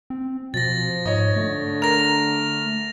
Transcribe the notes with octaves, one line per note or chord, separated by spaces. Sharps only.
C4
B2 F3 A6 A#6
G#2 C#5 D#5
D3 A3
A#4 A#6 F7